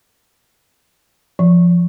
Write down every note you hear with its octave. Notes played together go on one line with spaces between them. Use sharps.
F3